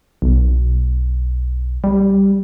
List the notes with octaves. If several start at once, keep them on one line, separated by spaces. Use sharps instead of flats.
B1
G3